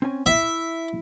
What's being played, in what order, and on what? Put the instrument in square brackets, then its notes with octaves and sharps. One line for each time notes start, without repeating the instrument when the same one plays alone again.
[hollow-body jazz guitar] C4 C#4 G#5
[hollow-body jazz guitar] E4 [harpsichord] E5